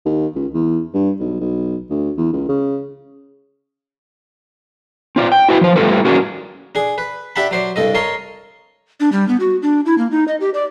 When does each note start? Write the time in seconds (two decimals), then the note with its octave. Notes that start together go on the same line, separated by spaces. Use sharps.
0.06 D#2
0.35 C#2
0.54 E2
0.94 G2
1.20 B1
1.40 B1
1.90 D2
2.17 E2
2.33 C#2
2.49 C#3
5.16 C4 F4 D5
5.32 G5
5.49 E4 F#4 B4 G#5
5.61 F3 C5
5.76 G3 A3 F4 A4 B4
6.05 C#4 F#4 G#4 A#4 D5
6.75 D4 G#4
6.98 B4
7.36 D4 G4 E5 F#5 A5 B5
7.51 F#3 C5 D5
7.76 C2 G2 A4 D#5
7.95 A#4 C#5 D#5 A5 C6
9.00 D4
9.12 G3
9.28 B3
9.40 F#4
9.62 D4
9.86 E4
9.98 A#3
10.11 D#4
10.28 D#5
10.40 G4
10.54 D5